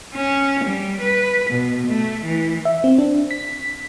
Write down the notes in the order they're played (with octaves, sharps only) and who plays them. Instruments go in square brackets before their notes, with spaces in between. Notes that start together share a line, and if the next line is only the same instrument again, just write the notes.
[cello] C#4
G3
B4
B2
A3
E3
[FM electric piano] E5
C4
D4
B6